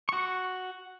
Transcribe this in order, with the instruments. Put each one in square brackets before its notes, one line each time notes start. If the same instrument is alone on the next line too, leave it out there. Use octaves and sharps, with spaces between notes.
[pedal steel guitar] F#4 C#6